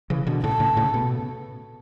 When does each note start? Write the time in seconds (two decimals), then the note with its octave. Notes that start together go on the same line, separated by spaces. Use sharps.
0.10 C#3 E3
0.27 B2 D3
0.43 A2 C#3 A4
0.60 A2 C#3
0.77 A2 C#3
0.94 B2